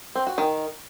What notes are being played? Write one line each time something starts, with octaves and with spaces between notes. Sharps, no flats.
C4
F#4
D#3